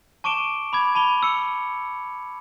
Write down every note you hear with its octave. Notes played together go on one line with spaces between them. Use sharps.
A5 C#6 D6 D7 E7 G7
B5 D6 G#6
A5 B5 F7 G7
B5 E6 C#7